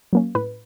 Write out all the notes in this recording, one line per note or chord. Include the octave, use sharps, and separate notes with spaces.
F#3 A#3 C#4
A2 B4